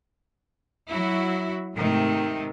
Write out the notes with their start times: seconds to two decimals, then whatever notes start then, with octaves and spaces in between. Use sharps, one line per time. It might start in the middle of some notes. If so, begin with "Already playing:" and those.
0.89 F#3 E4 F#4
1.75 G#2 C3 D#3 A3